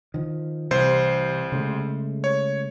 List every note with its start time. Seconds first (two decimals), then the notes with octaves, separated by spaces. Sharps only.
0.14 D#3 F3
0.71 C2 C3 E3 C5 C7
1.52 C#3 G#3 A3
2.24 C#5